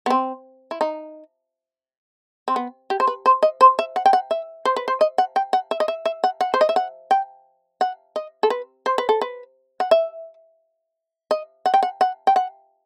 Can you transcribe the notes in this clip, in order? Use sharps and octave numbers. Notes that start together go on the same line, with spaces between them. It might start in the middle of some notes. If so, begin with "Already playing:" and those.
B3
C4
E4
D#4
C4
B3
G4
C5
B4
C5
D#5
C5
E5
F#5
G5
F#5
E5
C5
B4
C5
D#5
F#5
G5
F#5
E5
D#5
E5
E5
F#5
F#5
C5
D#5
E5
F#5
G5
F#5
D#5
A4
B4
C5
B4
A4
B4
F#5
E5
D#5
F#5
G5
F#5
F#5
G5
F#5